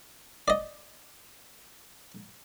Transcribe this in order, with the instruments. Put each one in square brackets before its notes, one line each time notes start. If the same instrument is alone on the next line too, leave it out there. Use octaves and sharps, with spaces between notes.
[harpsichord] D5 D#5